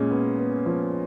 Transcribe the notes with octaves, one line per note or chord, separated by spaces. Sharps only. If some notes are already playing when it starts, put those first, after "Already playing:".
Already playing: A#2 G#3 C#4
B3
B3
F3